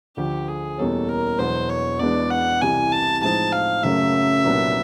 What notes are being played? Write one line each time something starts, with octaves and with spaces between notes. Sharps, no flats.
D2 D3 F3 G4
G#4
E2 B2 G3 A#3 C#4 A4
A#4
E1 E2 B2 F#3 B3 C5
C#5
E2 B2 G#3 B3 D4 D5
F#5
C2 C3 E3 G#5
A5
A2 F3 G#3 C4 D#4 A5
F5
F#1 F#2 C#3 F#3 A3 E5
C2 A#2 F#3 B3 D4